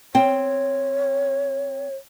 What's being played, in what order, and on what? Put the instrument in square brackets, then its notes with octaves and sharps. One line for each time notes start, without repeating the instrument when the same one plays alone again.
[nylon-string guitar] C4 G5 [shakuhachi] C#5